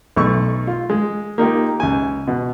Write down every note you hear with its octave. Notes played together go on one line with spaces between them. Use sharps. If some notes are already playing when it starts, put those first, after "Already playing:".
B1 A3 C#6
F4
G#3
A#3 D#4 F4 G4
C#2 G#5
B2